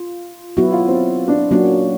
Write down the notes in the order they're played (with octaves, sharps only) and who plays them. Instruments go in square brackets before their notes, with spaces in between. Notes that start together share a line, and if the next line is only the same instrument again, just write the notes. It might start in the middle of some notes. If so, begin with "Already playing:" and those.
Already playing: [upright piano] F4
[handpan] F#3 B3 E4 [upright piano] F#4
[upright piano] F4
C4
D4
[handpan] F#3 A#3 C#4 F#4 [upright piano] D4